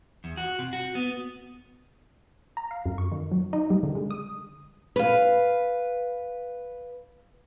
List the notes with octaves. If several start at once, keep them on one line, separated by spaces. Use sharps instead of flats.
E2
F#4
C3
F#4
B3
A#5
F5
F#2
C#6
D#3
F#3
D#4
G3
D3
G#3
D#6
B4 F5